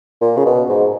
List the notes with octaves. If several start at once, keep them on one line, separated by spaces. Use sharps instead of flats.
A#2
C#3
B2
G#2